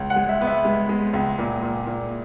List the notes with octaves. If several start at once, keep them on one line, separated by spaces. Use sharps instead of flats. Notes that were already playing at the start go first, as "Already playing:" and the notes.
Already playing: C#2
F#5
G#3
E5
B3
E5
G#3
G#3
C#2
A#2
A#2
A#2